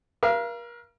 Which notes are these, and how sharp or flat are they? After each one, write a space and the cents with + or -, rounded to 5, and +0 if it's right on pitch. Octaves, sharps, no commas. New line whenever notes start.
A#4 +35 F5 -30